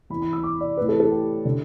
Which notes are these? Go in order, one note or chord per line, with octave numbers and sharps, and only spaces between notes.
E2 E3 B5
B5
E6
D6
D5
A2 E3 B4
A4
A4
G4
D3